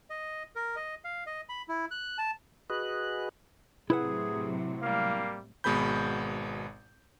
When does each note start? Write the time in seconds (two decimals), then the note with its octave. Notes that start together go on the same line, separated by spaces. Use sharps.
0.10 D#5
0.56 A#4
0.76 D#5
1.04 F5
1.27 D#5
1.49 B5
1.69 E4
1.91 F#6
2.18 A5
2.70 F#4 G#4 B4 D#5 F#6
3.90 A2 C3 F#3 E4 G#4 B4 F#5
4.82 G3 A#3 F5
5.64 G#1 B2 G#3 B3 B5 G6